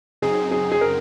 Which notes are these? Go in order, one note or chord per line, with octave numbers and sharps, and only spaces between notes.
F#2 C#3 F#3 C4 D#4 G#4
G#4
G#4
A#4